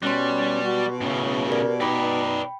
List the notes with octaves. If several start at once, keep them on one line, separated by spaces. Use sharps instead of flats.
B2 G3 C#4 C6 F#6
F#4
A2 C#3 C#4
G4 A#4 D5
D#4 B4 D5 G5 B5